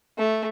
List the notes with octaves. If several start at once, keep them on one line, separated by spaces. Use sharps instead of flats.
A3